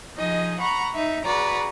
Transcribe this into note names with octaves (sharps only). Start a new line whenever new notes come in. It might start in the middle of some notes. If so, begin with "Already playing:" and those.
F3 D#4 G#4 D#5
F#5 A#5 B5 C#6
D#4 E5
F#4 G#4 B4 D5 A#5